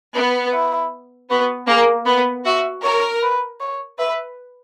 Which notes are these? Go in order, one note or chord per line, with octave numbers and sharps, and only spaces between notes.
B3
E4
B3 F#4
A#3 G#4
B3 B4
F#4 E5
A#4 C#5
B4
C#5
B4 E5